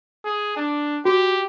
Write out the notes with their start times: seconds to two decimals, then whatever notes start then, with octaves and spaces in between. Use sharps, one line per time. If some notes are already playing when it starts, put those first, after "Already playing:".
0.25 G#4
0.57 D4
1.05 F#4 G4